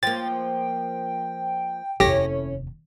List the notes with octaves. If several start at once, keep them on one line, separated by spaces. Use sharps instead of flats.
F3 A#3 G5 A6
F1 D#2 C#4 E4 G4 A4 A#6